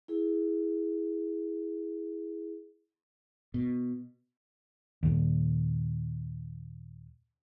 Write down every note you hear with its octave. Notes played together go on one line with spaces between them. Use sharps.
E4 G#4
B2
D#2 A#2